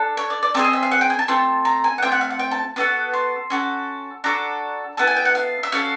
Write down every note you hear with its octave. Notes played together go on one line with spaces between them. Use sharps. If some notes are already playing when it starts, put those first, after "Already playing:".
Already playing: D4 A4
C#5
D5
D5
C4 D#4 G#4 A4
D#5
E5
F5
F#5
G5
G#5
A5
A3 C4 F4
A#5
G#5
F#5
A3 C4 F4 G5
F#5
F5
F#5
G5
A5
B3 D4 F#4 A4 F#5
C6
C#4 F#4 A4
D4 F#4 A4 A#5
B3 E4 A4 A5
G#5
G5
F#5
F5
E5
C#4 F#4 A4 F5